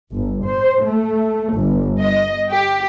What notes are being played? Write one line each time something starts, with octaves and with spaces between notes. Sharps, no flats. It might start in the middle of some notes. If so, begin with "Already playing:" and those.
G1
C5
A3
G1
D#5
G4